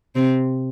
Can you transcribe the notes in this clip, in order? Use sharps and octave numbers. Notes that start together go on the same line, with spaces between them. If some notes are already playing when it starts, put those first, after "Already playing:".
C3 C4